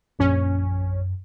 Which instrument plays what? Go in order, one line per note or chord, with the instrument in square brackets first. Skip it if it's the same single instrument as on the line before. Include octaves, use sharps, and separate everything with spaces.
[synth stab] A#1 C#4 [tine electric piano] F#2